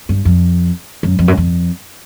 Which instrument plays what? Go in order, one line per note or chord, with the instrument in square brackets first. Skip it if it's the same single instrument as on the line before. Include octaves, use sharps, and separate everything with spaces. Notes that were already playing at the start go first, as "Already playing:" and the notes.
[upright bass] G2
F2
F#2
F2
F#2
F2